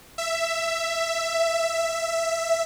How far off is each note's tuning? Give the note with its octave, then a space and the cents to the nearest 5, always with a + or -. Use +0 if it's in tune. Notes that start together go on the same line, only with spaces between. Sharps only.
E5 +10